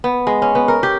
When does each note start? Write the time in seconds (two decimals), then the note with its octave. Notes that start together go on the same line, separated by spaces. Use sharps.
0.04 B3
0.27 G#3
0.42 C#4
0.55 B3
0.68 A#4
0.83 G4